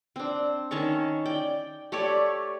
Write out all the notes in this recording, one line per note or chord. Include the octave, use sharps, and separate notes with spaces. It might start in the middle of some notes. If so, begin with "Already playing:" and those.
C4 D4
D#3 C#4 A5 C#6
D5 G5
A3 G4 C#5 D5